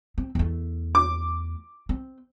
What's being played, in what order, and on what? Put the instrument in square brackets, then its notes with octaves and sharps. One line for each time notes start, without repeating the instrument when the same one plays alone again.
[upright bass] C4
E2 A3
[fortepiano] D6
[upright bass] C4